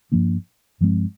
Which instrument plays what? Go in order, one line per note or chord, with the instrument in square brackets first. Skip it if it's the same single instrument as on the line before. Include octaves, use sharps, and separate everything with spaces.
[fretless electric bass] G2 F3 A#3 D4
G2 F3 G#3 C4